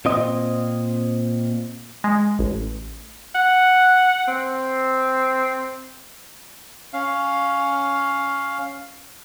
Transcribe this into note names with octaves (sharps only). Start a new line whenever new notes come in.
A#2 C4 D#5
G#3
A1
F#5
C4
C#4 F5